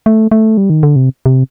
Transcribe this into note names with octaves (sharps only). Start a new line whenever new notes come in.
A3
A3
G3
D#3
D3
C3
C3